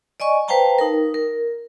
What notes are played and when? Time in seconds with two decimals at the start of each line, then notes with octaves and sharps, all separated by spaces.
0.20 D5 D#5 G#5 C#6
0.48 B4 C5 F5 G5 A5 A#5
0.79 D#4 A#4
1.14 A#4